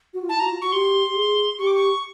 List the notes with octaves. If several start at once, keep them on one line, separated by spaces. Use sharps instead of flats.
F#4
F4
E4 A5
F#4 A#5
F4
F#4 C#6
G4 C6
G4
G#4
G4 C#6
D6
C#6